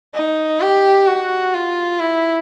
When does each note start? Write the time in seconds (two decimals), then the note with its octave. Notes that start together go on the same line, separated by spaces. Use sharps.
0.14 D#4
0.60 G4
1.06 F#4
1.53 F4
1.99 E4